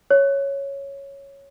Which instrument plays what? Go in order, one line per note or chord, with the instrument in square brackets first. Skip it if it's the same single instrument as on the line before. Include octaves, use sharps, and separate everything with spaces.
[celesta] C#5